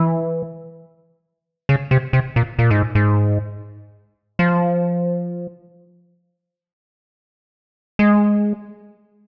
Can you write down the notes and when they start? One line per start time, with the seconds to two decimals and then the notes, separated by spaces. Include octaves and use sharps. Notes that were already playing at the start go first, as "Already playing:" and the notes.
Already playing: E3
1.69 C#3
1.91 C3
2.13 C3
2.36 A#2
2.59 A#2
2.71 G#2
2.95 G#2
4.39 F3
7.99 G#3